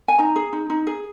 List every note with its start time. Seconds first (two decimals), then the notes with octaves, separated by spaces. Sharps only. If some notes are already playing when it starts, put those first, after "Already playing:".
0.08 G#5
0.19 D#4 A#5
0.36 G#4
0.53 D#4
0.70 D#4
0.87 G#4